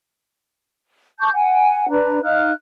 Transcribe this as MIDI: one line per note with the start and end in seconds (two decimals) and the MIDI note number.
1.20 1.31 81
1.20 1.31 85
1.20 1.31 86
1.20 1.31 91
1.33 1.89 78
1.33 1.89 80
1.90 2.19 62
1.90 2.19 71
1.90 2.19 82
2.23 2.52 63
2.23 2.52 77
2.23 2.52 89
2.23 2.52 90